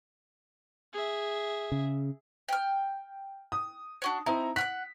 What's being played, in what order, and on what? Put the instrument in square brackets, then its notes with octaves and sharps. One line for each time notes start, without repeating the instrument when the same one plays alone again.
[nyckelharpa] G#4 E5
[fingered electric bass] C#3
[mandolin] G5 F6
[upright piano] D#6
[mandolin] D4 F#4 C#5
[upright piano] C4 E4 A#5 [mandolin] D#4
[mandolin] F#5 F6 F#6 [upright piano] B6